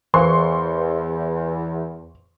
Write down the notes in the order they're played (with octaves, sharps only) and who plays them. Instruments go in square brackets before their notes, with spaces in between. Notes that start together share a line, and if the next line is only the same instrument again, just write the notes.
[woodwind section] E2 [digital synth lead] E3 [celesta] A#4 C5 F5 [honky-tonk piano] C6 C#6